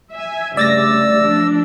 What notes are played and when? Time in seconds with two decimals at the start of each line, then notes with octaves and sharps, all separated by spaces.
0.12 E5 G#5
0.57 G2 C#3 A3 D5 E6 A6 A#6
1.22 F3 D4